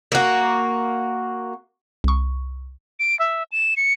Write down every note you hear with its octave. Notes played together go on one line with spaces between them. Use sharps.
A#3 F#4
C2 C#6
D7
E5
E7
C#7